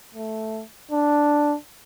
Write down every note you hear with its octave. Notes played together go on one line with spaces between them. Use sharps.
A3
D4